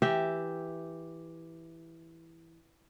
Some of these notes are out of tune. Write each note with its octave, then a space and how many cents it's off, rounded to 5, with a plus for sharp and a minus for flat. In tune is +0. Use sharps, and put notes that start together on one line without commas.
E3 +0 G4 -5 E5 +0